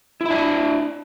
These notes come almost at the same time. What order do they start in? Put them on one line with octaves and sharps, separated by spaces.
E4 E5 D4